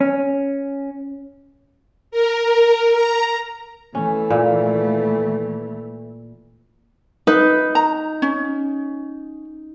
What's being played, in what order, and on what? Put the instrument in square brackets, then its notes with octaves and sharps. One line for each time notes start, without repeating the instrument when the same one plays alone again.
[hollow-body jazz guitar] C#4
[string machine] A#4
A#5
[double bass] E3 A3 [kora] C#4
[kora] A#2
[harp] D#4 [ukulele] B4
[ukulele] A#5
C#4